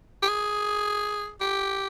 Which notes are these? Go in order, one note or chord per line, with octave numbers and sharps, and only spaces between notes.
G4
G#4
G4